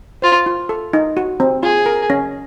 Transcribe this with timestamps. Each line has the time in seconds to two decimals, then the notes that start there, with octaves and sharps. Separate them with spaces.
0.22 F4 C5
0.46 F4
0.69 A4
0.93 D#4
1.17 F#4
1.40 C4
1.62 F4 G#4
1.86 A#4
2.10 C#4